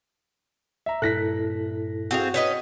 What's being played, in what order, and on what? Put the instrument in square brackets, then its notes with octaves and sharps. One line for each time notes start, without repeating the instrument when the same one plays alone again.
[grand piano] E5 A#5
[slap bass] G2 A#2 [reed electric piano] E4 A4 [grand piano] F#6 A#6 B6
[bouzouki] C4 G#4 F5 [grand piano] F#4
[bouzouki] C#4 B4 D#5